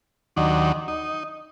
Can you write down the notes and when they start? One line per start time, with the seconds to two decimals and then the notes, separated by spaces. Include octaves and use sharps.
0.36 D#2 D#3 F#3 D4
0.88 D#4